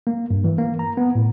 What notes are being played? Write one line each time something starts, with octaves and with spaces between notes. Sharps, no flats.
A#3
G2
E3
A#3
A#5
B3
A2